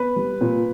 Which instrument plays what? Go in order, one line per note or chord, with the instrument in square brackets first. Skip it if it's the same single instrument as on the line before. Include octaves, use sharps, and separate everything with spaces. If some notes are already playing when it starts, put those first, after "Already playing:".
Already playing: [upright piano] B3 B4
G3
A#2